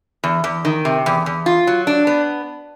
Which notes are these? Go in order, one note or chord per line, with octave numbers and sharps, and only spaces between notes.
E2
E2
D#3
C3
E2
E2
F4
F#3
D4
B3